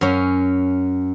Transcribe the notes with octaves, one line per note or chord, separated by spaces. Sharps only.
F#2 C#4